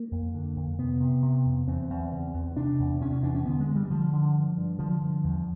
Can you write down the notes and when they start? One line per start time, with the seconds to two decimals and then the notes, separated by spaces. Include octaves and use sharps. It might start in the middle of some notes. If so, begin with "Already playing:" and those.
Already playing: A#3
0.11 F2
0.34 D3
0.56 F2
0.78 C3 B3
1.00 C3
1.22 C3
1.45 F2
1.67 E2 C4
1.90 E2
2.12 C#3
2.34 E2
2.56 C3 D4
2.79 E2
3.01 C3 C#4
3.12 C#4
3.23 E2 D4
3.35 C#4
3.45 D3 B3
3.60 G#3
3.67 G2
3.75 G3
3.90 D3 F3
4.13 D3
4.35 G2
4.57 G2
4.79 D3 F3
5.02 G2
5.24 E2